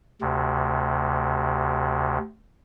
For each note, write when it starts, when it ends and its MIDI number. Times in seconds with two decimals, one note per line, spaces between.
0.21 2.18 38
0.21 2.18 48